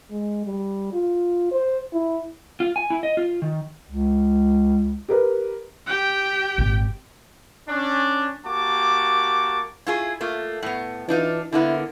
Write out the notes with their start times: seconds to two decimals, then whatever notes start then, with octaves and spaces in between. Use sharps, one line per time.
0.11 G#3
0.45 G3
0.92 F4
1.52 C5
1.93 E4
2.60 F4
2.76 G#5
2.90 E4
3.03 D#5
3.17 F4
3.42 D#3
3.89 C#2
5.09 G4 A#4 B4
5.87 G4 G5
6.58 G#1 A#2
7.69 C#4 D4
8.46 A#3 F#4 G4 A5 D6
9.87 E4 F4 G#4
10.21 A3 A#3 F4
10.62 A2 B3
11.08 E3 D4 D#4 F4
11.52 D3 A#3 B3 E4